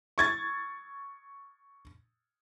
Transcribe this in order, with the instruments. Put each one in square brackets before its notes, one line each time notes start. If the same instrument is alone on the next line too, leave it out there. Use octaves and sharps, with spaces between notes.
[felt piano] C#6 G#6 A6